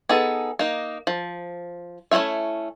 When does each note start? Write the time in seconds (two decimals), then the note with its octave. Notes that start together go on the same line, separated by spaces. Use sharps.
0.09 B3 D#4 G#4 A4
0.59 A#3 D#4
1.07 F3
2.11 A3 C#4 E4 F4 E5